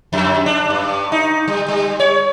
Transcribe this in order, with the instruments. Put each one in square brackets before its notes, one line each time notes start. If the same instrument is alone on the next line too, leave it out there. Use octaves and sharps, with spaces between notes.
[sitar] F2
D4
G2
D#4
G3
G3
C#5